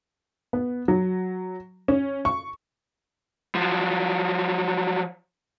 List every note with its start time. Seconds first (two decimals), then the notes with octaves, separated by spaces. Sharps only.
0.53 B3
0.88 F#3
1.88 C#4
2.25 C#6
3.55 F3 F#3